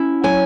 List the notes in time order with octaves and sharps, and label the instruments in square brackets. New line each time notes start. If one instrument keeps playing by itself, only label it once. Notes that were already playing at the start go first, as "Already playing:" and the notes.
Already playing: [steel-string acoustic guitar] C#4 E4
F#3 G#5